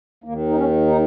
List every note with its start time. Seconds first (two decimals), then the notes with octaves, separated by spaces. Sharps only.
0.24 D#2 D#3 A#3
0.49 D#4
0.55 C#4
0.87 D#4